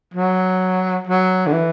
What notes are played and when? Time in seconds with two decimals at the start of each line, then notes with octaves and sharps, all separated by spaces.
0.14 F#3
1.07 F#3
1.47 D3
1.53 E3